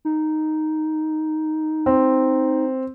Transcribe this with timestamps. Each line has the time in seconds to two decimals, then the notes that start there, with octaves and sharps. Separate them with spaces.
0.05 D#4
1.86 C4